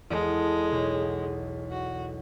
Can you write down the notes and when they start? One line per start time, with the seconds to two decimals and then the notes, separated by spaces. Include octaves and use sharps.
0.10 E2 G#3 A4
0.71 B1
1.71 F#4